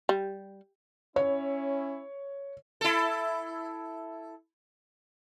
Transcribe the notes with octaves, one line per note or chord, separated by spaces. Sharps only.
G3
C#4 E4 C#5
E4 A4